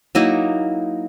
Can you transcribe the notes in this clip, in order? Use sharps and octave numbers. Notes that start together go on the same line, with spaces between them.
F#3 A#3 D#4 E4